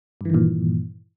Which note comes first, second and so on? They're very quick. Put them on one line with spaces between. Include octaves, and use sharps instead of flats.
G2 E3 D#3 A#2